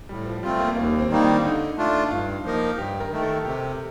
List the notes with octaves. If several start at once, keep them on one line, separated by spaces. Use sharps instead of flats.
A2 G3
F3
G3 A3 C4 F4
A#3
D#2 A#3
C4
D#3 G3 A#3 D#4
D4
D3 D#4
A3 D4 F4
G2 F4
F3 A#3 D#4 A#4
G2 G4
A#4
D#3 A3
A4
C3 G4